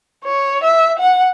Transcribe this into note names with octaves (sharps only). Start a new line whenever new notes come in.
C#5
E5
F#5